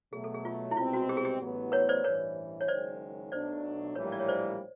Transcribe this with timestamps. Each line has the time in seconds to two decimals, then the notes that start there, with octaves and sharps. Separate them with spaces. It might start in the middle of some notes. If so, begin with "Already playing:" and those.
0.13 B2 F#3 A3 G#4
0.24 A4
0.34 G#4
0.45 F4
0.71 E4
0.77 C2 B2 G#3 C4 F4
0.93 F#4
1.09 G4
1.17 G#4
1.25 G4
1.41 A1 A2 F#3 B3
1.72 B4 C#5
1.89 C5 D5
2.04 A1 G2 E3 B4 C#5
2.61 C#5
2.68 F#1 F#2 D#3 G#3 C5 D5
3.32 B1 B2 F#3 A3 D4 C5 D5
3.95 A#1 A2 E3 G3 A#3 B4 C#5
4.12 D5
4.20 C#5
4.28 C5 D5